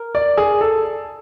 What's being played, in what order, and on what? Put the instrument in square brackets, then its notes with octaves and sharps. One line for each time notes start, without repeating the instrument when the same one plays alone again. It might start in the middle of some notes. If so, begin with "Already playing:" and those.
Already playing: [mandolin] A#4
[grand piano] D5
G#4
A4